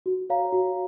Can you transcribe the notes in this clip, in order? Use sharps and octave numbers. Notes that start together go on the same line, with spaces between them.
F#4
C#5 F5 A#5
F#4